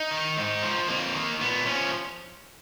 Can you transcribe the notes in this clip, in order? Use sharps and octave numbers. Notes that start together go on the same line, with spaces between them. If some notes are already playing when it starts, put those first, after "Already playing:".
Already playing: D#4
D#3
G#2
F3
F2 A#3
D#3
A#2 B3
F3 C#4